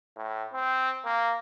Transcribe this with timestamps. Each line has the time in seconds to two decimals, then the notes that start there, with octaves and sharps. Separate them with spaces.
0.16 A2
0.53 C4
1.05 A#3